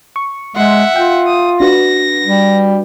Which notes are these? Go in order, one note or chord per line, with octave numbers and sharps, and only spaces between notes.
C#6
G#3 E5 F#5 C6
F4 G5
D#6
D4 F#4 B4 A#6
G3